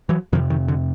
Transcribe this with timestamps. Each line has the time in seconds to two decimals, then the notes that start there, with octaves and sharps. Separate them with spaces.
0.09 E3 F#3
0.32 F2 C3 D#3 F3
0.50 D#3
0.68 D3